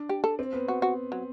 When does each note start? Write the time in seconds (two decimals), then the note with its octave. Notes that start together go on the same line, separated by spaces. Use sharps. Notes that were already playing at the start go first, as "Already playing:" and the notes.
Already playing: D4
0.09 G4
0.24 A4
0.39 C4
0.53 B3
0.68 F#4
0.82 F#4
1.12 F#3